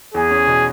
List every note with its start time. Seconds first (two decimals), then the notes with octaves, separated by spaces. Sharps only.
0.14 E2 G#4
0.31 C#4
0.47 B2